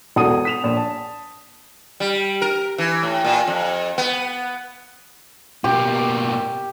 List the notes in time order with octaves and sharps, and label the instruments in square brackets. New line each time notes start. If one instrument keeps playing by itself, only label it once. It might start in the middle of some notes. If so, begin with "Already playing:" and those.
[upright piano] E1 F#4 A4 D#6 D#7
B6 E7 F7
A#1
A5
[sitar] G3
A#4
E3
A2
A#2
F2
B3
[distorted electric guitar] B2 A#3 [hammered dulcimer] G4